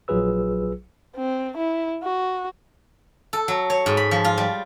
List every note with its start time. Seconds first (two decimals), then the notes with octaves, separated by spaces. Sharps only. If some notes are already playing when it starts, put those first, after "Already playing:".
0.08 A#1 F#3 F4 G#4 B4 E6
1.16 C4
1.57 E4
2.03 F#4
3.33 A4
3.48 F#3
3.70 C#5
3.86 G#2
3.97 B5
4.11 F3
4.24 F4
4.38 G3